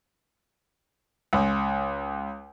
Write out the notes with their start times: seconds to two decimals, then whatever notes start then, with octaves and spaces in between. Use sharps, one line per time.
1.33 C#2